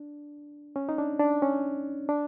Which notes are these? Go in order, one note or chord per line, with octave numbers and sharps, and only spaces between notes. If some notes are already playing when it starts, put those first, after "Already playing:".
Already playing: D4
C#4
D#4
D4
D4
C#4
D4